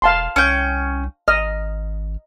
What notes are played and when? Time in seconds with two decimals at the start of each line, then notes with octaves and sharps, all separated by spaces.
0.02 E1 F5 A5 C6
0.36 C2 C#4 G5
1.28 G#1 D#5 F6